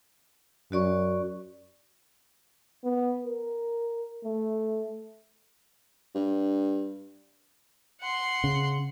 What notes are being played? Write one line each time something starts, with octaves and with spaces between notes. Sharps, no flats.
F#2 F#4 D5 C#6
B3
A#4
A3
G2
F#5 C6
C#3